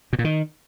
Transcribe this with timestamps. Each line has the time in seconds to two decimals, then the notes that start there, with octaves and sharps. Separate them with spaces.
0.13 B2
0.19 A#2
0.24 D#3